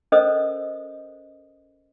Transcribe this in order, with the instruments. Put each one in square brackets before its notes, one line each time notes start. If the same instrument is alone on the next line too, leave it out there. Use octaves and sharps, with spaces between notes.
[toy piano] C#4 A4 A#4 C5 D#5 D#6